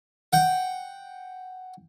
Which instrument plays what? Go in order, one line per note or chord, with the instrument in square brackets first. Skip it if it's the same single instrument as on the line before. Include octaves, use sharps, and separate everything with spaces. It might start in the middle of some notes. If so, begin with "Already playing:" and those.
[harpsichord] F#5 G5